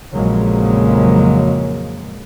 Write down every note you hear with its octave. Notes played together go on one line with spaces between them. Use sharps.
A#1 F2 C#3 F#3 G#3 A#3